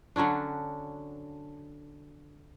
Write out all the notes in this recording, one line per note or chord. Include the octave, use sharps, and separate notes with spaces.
D3 F#3 C#4 D4